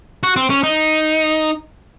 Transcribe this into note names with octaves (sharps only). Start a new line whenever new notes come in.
F#4
C4
C#4
D#4